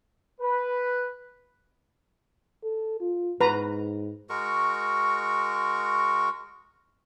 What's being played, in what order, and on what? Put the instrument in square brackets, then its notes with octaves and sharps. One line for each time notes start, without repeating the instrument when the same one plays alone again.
[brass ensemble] B4
[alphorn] A4
F4
[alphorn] G#2 [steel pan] B4 A#5
[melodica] G#3 F#4 A#4 C#6